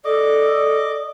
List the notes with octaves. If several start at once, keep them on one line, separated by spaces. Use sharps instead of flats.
A4 D5 D#5 D6